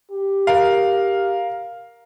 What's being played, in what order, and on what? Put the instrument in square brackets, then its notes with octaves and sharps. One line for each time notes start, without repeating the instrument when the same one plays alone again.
[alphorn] G4
[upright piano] A#4 F5